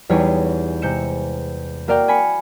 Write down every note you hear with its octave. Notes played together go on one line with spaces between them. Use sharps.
E2 G3 D#4 G#4 C#5 C7
C3 G#3 G6 C#7 E7
A#3 F#4 A#4 D5 F5 G5
G#5 B5 C#7